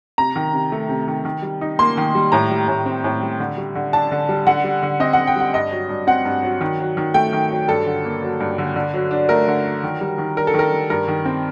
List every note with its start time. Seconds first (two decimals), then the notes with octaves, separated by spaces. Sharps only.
0.18 C3 A#5
0.36 D#3
0.54 C3
0.72 A3
0.89 C3
1.08 D#3
1.25 D#3
1.42 G3
1.61 D#4
1.79 A#3 C6
1.97 D#3
2.15 G3
2.32 A2 A#5
2.51 G3
2.68 A2
2.86 C4
3.04 A2
3.22 G3
3.39 D3
3.57 G3
3.75 D3
3.93 D4 A5
4.11 D3
4.29 G3
4.47 D3 F#5
4.64 G3
4.83 D3
5.00 C4 D#5
5.13 F#5
5.18 D3
5.27 G5
5.36 G3 F#5
5.54 G2 D#5
5.71 F#3
5.89 G2
6.07 C4 F#5
6.25 G2
6.43 F#3
6.61 D#3
6.79 F#3
6.97 D#3
7.14 A3 G5
7.33 D#3
7.51 F#3
7.68 G2 A4
7.86 D3
8.04 A#3
8.22 F#3
8.41 G2
8.58 D3
8.76 D3
8.94 F#3
9.11 D4
9.29 A3 A#4
9.48 D3
9.65 F#3
9.83 D#3
10.01 G3
10.18 D#3
10.37 D4 A#4
10.47 A4
10.54 D#3
10.59 A#4
10.72 G3
10.90 G2 A#4
11.08 D#3
11.25 C4